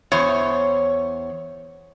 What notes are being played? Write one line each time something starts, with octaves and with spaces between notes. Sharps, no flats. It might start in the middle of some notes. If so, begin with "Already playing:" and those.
E2 C5 C#5